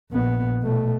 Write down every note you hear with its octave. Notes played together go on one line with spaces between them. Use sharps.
A#1 B3
B2 A3